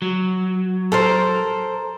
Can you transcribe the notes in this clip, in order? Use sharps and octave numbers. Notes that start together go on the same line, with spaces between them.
F#3
A4 A#4 C5